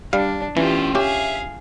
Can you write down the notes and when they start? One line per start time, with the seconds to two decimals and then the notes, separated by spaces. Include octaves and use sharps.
0.13 G3 D4 F5
0.57 E3 C#4 F4 G4 C5
0.95 C#4 G4 G#4 E5 F5